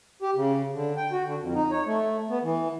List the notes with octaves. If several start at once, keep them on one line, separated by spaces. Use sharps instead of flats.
G4
C#3
D3
G5
F#4
D3
F2
D#4
C#5
A3
B3
E3